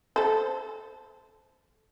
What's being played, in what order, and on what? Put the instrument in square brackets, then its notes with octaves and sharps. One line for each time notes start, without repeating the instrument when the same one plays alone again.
[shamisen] A4 C5